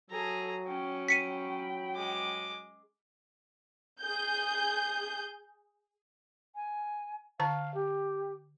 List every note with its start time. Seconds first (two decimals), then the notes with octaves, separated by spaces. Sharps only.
0.10 F#3 G#4 A4 A#5
0.68 C#4 G5
1.08 G5 B5 B6 C#7 D#7
1.95 G#3 D6
4.03 G#4 G6
6.55 G#5
7.40 D3 F5 A5 A#5
7.74 G4